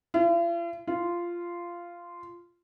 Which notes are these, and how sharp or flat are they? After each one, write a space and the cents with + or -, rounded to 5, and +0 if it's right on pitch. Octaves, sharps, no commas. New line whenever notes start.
F4 -45
F4 -10